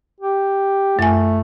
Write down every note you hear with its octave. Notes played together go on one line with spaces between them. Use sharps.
G4
F#2 A3 G#5